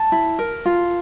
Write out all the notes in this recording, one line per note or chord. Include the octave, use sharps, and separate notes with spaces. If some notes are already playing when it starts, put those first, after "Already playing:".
Already playing: A5
E4
A#4
F4